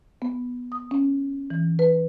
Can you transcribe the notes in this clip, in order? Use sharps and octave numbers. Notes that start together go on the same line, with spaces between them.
B3
D#6
C#4
E3
B4